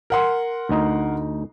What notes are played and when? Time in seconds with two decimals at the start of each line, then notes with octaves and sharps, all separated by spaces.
0.10 A#4 F#5 C6
0.69 D2 D#4 D#5